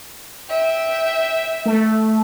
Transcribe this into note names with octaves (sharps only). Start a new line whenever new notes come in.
E5 G5
A3